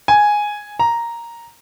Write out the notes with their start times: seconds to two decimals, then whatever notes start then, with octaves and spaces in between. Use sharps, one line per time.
0.08 G#5
0.79 A#5